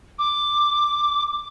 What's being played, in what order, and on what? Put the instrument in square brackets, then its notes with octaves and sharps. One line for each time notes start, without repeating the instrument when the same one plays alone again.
[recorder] D6